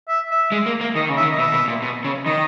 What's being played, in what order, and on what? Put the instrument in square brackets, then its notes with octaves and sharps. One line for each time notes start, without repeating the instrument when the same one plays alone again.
[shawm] E5
E5
[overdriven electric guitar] G#3
A#3
A#3
[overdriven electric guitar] D#3 [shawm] D#5
[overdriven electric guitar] C#3
[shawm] E5
[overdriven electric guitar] D#3
[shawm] D#5
[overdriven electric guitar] B2 [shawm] E5
[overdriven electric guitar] B2
A#2
B2
C#3
[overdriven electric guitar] D#3 [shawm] D#5